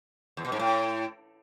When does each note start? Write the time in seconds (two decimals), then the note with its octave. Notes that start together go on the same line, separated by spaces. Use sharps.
0.37 E2
0.45 B2
0.52 G#2
0.59 A2